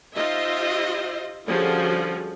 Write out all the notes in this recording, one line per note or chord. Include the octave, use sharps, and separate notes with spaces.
D#4 F4 G4 C5 D#5 E5
D3 F3 G3 C#4 F#4 G#4